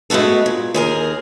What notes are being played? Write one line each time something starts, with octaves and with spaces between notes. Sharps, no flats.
G#3 A3 B3 F#4 A4
A#2
D#2 G#4 A#4